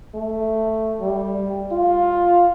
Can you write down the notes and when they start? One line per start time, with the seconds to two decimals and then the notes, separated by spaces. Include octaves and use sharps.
0.15 A3
1.01 G3
1.72 F4